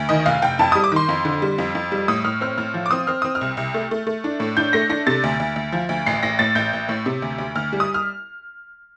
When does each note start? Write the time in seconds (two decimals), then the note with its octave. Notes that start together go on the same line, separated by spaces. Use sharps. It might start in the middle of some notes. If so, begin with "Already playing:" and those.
Already playing: D2
0.09 D#3 D#5
0.26 F1 F5
0.42 F1 G5
0.59 F2 A5
0.72 G3 D#6
0.84 D6
0.92 D#3 C6
1.09 F2
1.25 D3
1.42 G3
1.58 F2
1.75 F2
1.92 G3
2.08 A2 D#6
2.25 A2 F6
2.41 C4 F6
2.58 A2 F6
2.74 F3
2.86 D6
2.91 C4 D#6
3.07 C4 F6
3.22 C4 D#6
3.35 F6
3.41 C2
3.57 C2
3.74 A3
3.91 A3
4.07 A3
4.24 D4
4.40 A2
4.57 D4 G6
4.73 A3 A#6
4.89 D4 A#6
5.07 C3 A6
5.24 D2
5.40 D2
5.56 D2
5.72 F3
5.89 D2
6.06 A1 C7
6.23 A1 A#6
6.39 A2 A6
6.55 A1 G6
6.73 A1
6.89 A2
7.06 C3
7.22 D2
7.38 D2
7.55 D2 F6
7.73 G3
7.80 D#6
7.94 F6